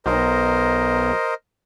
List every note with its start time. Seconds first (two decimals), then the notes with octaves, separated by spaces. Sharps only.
0.06 B1 A#4 C5 D#5